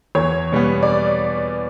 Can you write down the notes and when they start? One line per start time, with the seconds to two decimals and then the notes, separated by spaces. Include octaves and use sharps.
0.15 E2 C#5
0.52 B2 G3 B3
0.82 D5